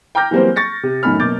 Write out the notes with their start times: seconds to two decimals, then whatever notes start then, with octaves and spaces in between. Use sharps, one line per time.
0.15 G5 A#5 D6 F6 G6 A#6
0.31 E3 F#3 G3 A#3 C4 C5
0.56 C#6 A6 A#6 C#7
0.83 C3
1.03 F#2 A2 D#3 G#5 B5 F6
1.20 F#2 B2 A#3 D6 G6 A6